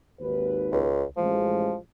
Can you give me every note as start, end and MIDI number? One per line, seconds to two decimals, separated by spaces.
0.20 0.85 32
0.20 0.85 39
0.20 0.85 71
0.72 1.03 37
1.17 1.74 33
1.17 1.76 53
1.17 1.74 56